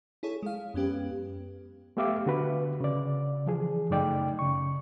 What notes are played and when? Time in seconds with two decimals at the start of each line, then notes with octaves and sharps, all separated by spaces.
0.23 E4 G#4 A4 C#5
0.43 G#3 F5
0.74 F#2 B3 C#4 G4 B4
1.97 A3 B3 G4 E5 F5 D6
2.26 D3 F#4 B4
2.81 C#3 D5
3.46 E3 F3 G#4
3.90 F#2 C#3 A3 D#4 D5 G5
4.39 C#3 C#6